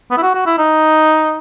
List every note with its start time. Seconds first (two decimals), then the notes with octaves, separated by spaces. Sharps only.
0.11 B3
0.17 E4
0.23 F#4
0.35 F#4
0.46 E4
0.58 D#4